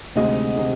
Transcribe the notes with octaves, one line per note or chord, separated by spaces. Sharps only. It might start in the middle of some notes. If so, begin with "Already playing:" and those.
D2 C3 D#3 G#3 D#5
C3 D#3 G#3